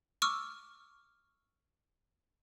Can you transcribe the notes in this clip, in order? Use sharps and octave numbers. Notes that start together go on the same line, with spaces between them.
C#6 D6 E6 F6